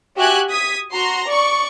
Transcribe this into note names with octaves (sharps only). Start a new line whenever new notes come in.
F#4 G4 E5 G#5 F#6 G#6
D#6 G#6 B6
F#4 A#5 C6
D5 C#6